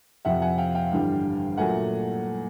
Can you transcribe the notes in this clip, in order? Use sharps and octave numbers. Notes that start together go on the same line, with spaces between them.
F2 C3 F3 E5 F#5
F#5 G#5
F5 G5
F5 G5
A1 G2 D3 G3
A#2 F#3 A3 F#5 G#5